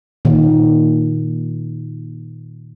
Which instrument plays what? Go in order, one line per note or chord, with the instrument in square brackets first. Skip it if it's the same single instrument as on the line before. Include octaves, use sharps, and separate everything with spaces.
[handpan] A#2 D#3